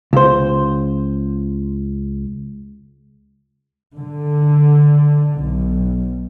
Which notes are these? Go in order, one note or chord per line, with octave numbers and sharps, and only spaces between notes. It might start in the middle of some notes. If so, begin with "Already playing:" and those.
C#2 C5
D3
B1